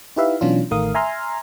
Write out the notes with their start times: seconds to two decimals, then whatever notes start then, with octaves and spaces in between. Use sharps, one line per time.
0.16 D#4 E4 G4 B4 E5 F5
0.41 B2 E3 F#3 C#4 D4 F4
0.71 A1 D#3 A3 A#4 F5 D#6
0.94 E5 G#5 A#5 C6 F6